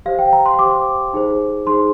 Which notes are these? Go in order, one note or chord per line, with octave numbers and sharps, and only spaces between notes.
G4 C5 F5
G5
A#5
C6
G4 C5 D6
D#4 G#4 C5
D#4 G#4 C5 C6